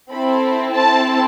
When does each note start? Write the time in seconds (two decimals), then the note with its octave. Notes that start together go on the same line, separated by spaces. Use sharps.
0.12 C4 E4 A4 B5
0.75 A5